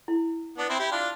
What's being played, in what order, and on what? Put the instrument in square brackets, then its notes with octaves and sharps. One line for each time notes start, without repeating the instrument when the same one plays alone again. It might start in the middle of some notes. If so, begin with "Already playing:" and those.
[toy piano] E4
[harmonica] B3 D4
C4 E4
E4 G4
D4 F4